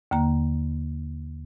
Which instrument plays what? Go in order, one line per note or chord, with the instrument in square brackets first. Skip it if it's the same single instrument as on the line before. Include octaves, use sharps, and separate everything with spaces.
[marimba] D#2 D3 A#3 A#5